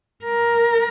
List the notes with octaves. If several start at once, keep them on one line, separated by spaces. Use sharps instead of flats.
A#4